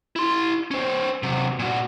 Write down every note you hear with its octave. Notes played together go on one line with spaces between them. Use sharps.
E4 C6
C#4 C5
C3 F#3
A#2 F#4